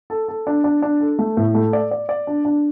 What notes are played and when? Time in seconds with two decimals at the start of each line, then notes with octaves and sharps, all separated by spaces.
0.10 A4
0.28 A4
0.47 D4
0.64 D4
0.82 D4
1.00 A4
1.19 A3
1.37 A2
1.55 A3
1.73 D5
1.91 D5
2.09 D5
2.27 D4
2.45 D4